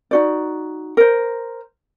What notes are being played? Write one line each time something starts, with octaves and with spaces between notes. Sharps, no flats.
D#4 F#4 D5
A#4 C5